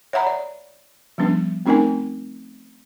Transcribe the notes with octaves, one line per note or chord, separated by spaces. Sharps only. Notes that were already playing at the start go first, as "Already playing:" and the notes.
C#5 E5 F#5 A#5 B5
D5
F3 G3 B3 C#4 D4
A3 C4 C#4 D#4 A#4 G#5